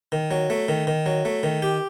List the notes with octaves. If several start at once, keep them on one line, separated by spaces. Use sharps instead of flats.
D#3
F#3
A3
D#3
D#3
F#3
A3
D#3
G4